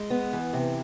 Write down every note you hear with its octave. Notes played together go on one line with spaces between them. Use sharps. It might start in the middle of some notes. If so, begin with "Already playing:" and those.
Already playing: G#3
B3
E3
C3